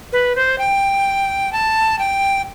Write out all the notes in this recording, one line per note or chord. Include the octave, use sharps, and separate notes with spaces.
B4
C5
G5
A5
G5